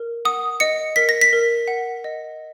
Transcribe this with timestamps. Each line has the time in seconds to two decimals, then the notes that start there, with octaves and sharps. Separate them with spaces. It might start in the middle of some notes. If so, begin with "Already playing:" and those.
Already playing: A#4
0.25 F#5 D#6
0.60 D#5 C#7
0.96 A#4 B6
1.09 A#6
1.21 B6
1.33 A#4
1.68 F#5
2.04 D#5